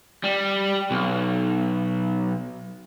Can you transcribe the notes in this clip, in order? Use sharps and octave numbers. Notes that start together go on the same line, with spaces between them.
G3
B1